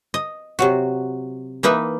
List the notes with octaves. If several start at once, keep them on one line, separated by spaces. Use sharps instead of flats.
D#5
C3 F#3 F#4
E3 A#3 D#4 B4 E5